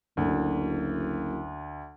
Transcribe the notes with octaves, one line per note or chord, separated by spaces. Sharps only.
F#1 D2